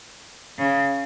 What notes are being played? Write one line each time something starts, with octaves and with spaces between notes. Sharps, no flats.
C#3